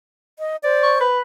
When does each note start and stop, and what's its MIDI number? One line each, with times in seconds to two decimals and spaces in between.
0.39 0.56 75
0.64 1.07 72
0.64 0.99 74
0.83 1.01 85
1.01 1.20 71